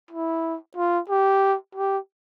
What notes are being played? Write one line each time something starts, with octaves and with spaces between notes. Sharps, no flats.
E4
F4
G4
G4